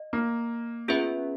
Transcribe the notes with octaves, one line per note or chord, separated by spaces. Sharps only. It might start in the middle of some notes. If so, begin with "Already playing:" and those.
Already playing: D#5
A#3
B3 C#4 F4 G#4 B4 E5